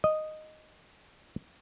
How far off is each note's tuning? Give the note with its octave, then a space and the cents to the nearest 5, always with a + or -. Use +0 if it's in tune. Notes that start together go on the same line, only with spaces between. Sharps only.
D#5 -5